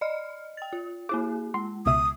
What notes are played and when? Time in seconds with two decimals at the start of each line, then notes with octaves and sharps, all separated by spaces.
0.01 D5 D#5 F6
0.57 G5 A6
0.73 F4
1.09 A#3 E4 G#4 D6
1.54 G#3 C6
1.86 C#2 B2 E5 D#6